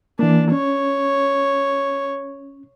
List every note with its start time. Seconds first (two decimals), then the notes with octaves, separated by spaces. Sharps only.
0.19 E3 A#3 D4
0.52 C#4 C#5